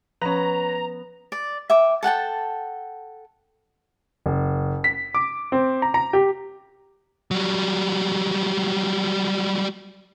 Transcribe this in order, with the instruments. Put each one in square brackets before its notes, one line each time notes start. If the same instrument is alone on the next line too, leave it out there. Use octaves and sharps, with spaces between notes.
[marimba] F3 C#4 [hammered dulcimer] B3 [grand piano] B4 C#5 [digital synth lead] A#5
[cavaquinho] D5
E5 G5 D6
A4 F#5 G5 A5
[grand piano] F#1
B6
D6
C4
A#5
A#5
G4
[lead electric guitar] F#3 G3